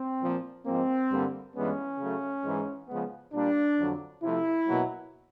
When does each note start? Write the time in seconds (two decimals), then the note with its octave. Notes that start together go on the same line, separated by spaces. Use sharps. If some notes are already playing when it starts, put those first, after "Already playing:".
Already playing: C4
0.22 A#2 F3 A#3
0.66 G#2 F3 A#3 C4
1.11 G2 D3 G3 A#3
1.55 G2 E3 G#3 B3 C#4
1.99 C#3 F#3 A3
2.44 G#2 E3 G#3
2.88 C#3 F3 G#3 B3
3.33 A#2 G3 A#3 D4
3.77 F2 D3 F#3
4.22 C3 F3 A3 E4
4.67 B2 F#3 A#3